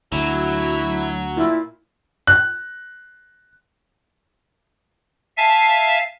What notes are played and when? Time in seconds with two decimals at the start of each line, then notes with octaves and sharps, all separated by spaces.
0.12 D2 F#3 E4
1.36 A#2 E4
2.27 F#6
5.37 E5 F5 G#5 A5